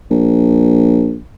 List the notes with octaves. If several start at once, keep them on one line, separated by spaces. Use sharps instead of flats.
A#1